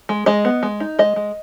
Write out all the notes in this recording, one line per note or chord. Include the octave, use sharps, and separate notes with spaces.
G#3
G#3 D#5
B3
G#3
D#4
G#3 D#5
G#3